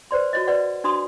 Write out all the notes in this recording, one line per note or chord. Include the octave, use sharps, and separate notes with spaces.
B4 C5 D5 C6
F#4 C#5 D#5
B4 D5 F#5
D4 F#4 C6 D#6